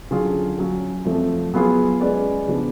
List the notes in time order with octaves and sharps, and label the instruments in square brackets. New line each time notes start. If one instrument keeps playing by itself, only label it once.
[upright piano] D3 F#3 C#4 F4 G#4
F#3 C#4 F#4
F2 F3 A3
F#3 B3 F4 G#4
G#3 C#4 G#4 B4 D5
C#3 F3 B3 D4